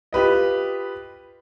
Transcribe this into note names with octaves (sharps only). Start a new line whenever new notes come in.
F4 G4 B4 D#5